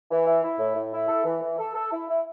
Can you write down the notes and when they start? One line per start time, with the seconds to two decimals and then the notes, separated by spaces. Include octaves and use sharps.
0.11 E3
0.26 E4
0.44 E4
0.59 A2
0.76 A2
0.93 E4
1.08 A4
1.25 E3
1.41 E3
1.58 A4
1.75 A4
1.92 E4
2.09 E4